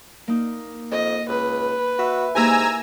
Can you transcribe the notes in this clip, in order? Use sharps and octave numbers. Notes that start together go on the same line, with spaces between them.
A#3 D#4
F2 D#5
C#2 B4
F#4 E5
G#2 A#3 E4 G4 G#5 A#5 E6